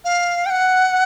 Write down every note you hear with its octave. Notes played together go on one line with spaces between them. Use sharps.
F5
G5
F#5